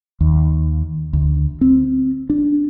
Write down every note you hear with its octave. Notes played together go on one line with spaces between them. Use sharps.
D#2
D2
C4
D4